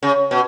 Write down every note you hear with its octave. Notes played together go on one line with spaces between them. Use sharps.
C#3
B2